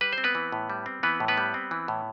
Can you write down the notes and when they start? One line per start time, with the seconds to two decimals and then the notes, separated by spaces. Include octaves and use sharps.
0.01 G3 B4
0.13 C5
0.18 C4
0.24 B3 B4
0.35 E3
0.52 A2
0.70 G3
0.86 C4
1.03 E3 B3 B4
1.20 A2
1.28 B3 B4
1.37 G3
1.54 C4
1.71 E3
1.88 A2